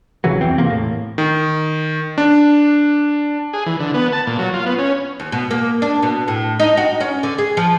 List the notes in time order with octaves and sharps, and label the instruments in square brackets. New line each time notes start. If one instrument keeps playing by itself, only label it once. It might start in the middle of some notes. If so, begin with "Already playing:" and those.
[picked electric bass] A#1 C#3 E3 F#3
E2 E3 C4
E2 C3 A#3
A2
[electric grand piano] D#3
D4
[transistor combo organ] G#4
E3
D3
B3
A5
A#2
F#3
F4
B3
C#4
[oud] D#2
B2
A#3
D4
B2
A2
D#4
F#4
C#4
D3
G#4
F3